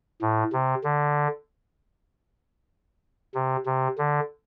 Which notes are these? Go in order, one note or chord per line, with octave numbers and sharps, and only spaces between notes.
A2
C3
D3
C3
C3
D3